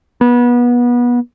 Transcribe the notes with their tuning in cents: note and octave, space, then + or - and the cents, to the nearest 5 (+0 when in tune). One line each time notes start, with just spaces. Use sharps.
B3 -25